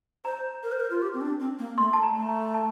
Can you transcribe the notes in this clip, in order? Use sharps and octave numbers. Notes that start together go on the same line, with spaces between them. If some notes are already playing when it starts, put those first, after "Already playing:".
C5 A#5
A#4
C5
A#4
F4
G4
C4
D4
C4
A#3
A3 C6
A5
A#5
A3
A#5
A5